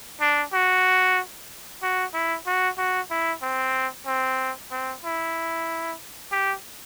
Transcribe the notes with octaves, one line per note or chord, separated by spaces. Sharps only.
D4
F#4
F#4
E4
F#4
F#4
E4
C4
C4
C4
E4
G4